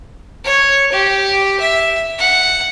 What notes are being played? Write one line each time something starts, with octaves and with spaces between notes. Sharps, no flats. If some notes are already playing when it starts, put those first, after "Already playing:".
C#5
G4
E5
F#5